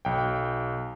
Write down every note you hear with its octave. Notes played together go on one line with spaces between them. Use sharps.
B1 G5